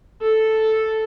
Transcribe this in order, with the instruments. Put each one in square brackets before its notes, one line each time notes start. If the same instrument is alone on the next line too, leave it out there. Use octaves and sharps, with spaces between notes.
[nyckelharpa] A4